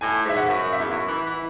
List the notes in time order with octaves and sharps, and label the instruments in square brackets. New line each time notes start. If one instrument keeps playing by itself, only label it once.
[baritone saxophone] A2 [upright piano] G#5
[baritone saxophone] G#2 [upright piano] E5
[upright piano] F#5
[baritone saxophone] F#2
[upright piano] E5
[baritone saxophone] E2
F#2
E3
E3